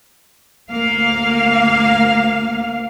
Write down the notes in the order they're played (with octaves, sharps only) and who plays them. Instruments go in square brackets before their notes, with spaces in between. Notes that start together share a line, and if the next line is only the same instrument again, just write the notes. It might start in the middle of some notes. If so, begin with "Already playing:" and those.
[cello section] D2 A#3 F5